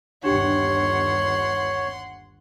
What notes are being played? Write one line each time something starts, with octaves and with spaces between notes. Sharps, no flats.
G1 D#2 D4 G4 C#5 F#5 G5 C6